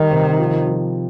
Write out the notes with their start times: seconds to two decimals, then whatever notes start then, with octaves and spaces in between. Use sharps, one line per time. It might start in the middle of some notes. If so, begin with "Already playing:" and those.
Already playing: D#3 G3 D#4
0.11 C3
0.39 F3
0.67 F3